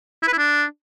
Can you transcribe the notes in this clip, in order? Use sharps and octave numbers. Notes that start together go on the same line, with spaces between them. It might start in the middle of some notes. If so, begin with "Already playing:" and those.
E4
B4
E4
D4